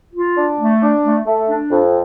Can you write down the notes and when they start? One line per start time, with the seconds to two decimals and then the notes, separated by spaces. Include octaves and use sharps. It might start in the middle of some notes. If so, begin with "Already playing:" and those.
0.14 F4
0.36 D4
0.59 A3
0.82 D4
1.04 A3
1.26 A3
1.48 D4
1.70 F2